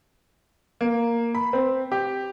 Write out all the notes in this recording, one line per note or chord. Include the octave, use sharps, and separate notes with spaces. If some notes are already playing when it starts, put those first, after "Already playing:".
A#3
B5
C4
G4